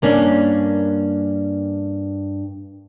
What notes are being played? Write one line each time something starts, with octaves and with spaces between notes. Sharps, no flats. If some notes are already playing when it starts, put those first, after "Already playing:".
G2 A#3 C#4 D4